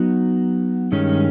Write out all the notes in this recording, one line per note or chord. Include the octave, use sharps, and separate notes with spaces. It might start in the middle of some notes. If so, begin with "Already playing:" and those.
Already playing: F#3 B3 D#4 F#4
G2 D#3 G#3 C#4